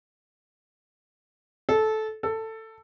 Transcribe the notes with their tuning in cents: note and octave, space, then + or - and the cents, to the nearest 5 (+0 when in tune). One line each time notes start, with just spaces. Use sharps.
A4 -15
A4 +15